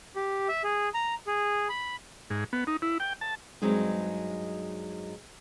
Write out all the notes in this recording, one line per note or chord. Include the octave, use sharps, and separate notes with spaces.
G4
E5
G#4
A#5
G#4
B5
G#2
B3
D#4
E4
G5
A5
G2 F#3 G#3 C4 D#4